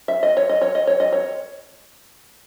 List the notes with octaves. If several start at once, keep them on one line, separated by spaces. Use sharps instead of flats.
E5
D#5
C#5
D#5
C#5
D#5
C#5
D#5
C#5